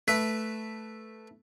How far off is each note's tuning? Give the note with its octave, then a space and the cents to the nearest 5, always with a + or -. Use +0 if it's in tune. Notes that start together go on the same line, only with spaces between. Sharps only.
A3 +0 B4 +0 E5 +0